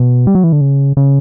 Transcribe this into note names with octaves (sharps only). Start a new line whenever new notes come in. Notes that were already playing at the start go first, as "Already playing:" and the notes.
Already playing: B2
G3
F#3
E3
D3
C#3
C#3